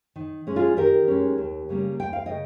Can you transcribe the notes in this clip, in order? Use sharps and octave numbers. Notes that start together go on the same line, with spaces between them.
D#3
G#3 C#4
F4 G#4
D#3 G4 A#4
G#3 C#4
D#2
C#3 G3 A#3
D#2 G5
F5
C#3 D#5 G5